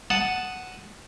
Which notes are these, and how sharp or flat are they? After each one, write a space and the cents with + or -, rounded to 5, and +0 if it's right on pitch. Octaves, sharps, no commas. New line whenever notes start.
F#5 +0 A5 +0 D#6 +0